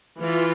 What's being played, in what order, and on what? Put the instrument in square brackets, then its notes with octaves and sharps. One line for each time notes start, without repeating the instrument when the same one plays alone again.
[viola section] E3 F4